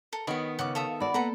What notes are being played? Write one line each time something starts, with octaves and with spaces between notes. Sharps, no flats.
A4 A#4
D#3 B3 F#4 C#5 B5
C#3 F#5 D6
A4 E5 F5 D#6
F#4 D5 F#5 B5
A#3 B3 A4 B4 F#5 A#5